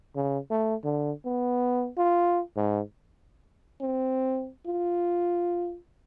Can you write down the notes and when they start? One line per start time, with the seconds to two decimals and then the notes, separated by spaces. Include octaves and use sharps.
0.16 C#3
0.51 A3
0.84 D3
1.26 B3
1.97 F4
2.57 G#2
3.81 C4
4.66 F4